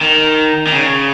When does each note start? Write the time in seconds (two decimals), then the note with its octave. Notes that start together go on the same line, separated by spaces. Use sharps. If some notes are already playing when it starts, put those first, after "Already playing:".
0.01 D#3
0.67 D#3
0.72 C#3